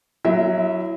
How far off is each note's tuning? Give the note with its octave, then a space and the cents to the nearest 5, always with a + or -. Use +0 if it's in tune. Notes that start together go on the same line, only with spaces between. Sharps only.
F#3 +0 E4 +20 E5 -35